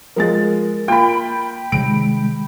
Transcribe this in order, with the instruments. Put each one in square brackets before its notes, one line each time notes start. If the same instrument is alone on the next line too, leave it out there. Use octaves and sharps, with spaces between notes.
[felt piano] F3 G#3 A6 [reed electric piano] A#4
[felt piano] A#3 F4 [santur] G5 B5
[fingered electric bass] C3 D#3 G3 [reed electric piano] G#3 [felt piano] D7